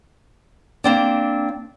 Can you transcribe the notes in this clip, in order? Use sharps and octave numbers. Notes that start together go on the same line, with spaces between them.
A#3 C4 D4